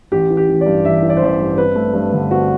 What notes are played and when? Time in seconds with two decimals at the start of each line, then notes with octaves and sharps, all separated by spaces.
0.12 A1 G4
0.30 E3
0.37 G4
0.48 A1
0.61 D5
0.66 G2
0.85 A1 E5
1.03 E3
1.10 D5
1.17 C5
1.22 A1 D5
1.40 G2
1.57 C4 B4
1.75 A3
1.94 G2
2.13 D3
2.30 C4 F#4